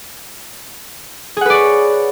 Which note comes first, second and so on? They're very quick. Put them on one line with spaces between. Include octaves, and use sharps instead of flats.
G#4 F#5 B4 D5 C#5